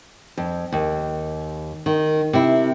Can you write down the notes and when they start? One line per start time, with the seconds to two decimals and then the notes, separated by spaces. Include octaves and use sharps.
0.38 F2
0.72 D#2
1.86 D#3
2.33 C3 E4